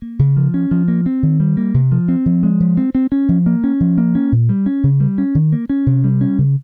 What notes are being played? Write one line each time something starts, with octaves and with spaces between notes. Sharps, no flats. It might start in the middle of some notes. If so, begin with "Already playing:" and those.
A#3
C#3
F3
C#4
F3
A#3
C4
D#3
G3
A#3
C3
F3
C4
F3
G#3
F3
C4
C4
C#4
F3
A#3
C#4
F3
A#3
C#4
A#2
G3
C#4
C#3
G3
C#4
D#3
A#3
C#4
C3
G3
C#4
C#3